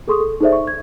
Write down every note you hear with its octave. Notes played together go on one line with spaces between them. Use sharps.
G#4 A4 C6 C#6 D#6
A4
D#4 G#4 A4 C5 D5 E5
C#6
G#6